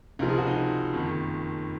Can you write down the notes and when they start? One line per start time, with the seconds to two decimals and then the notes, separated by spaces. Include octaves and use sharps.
0.19 C#2 C3 F3 A#4
0.29 G#4
0.38 F#4
0.47 D#4
0.93 F#1 F2 D#3